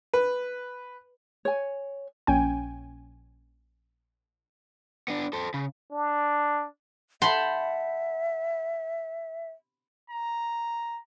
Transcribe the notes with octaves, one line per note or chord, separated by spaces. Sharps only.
B4
C#5 G#5
A#1 C#4 G5 G#5
B3 D4
A4 C5
C#3
D4
E5 F#5 A5 B5 C6 G6
A#5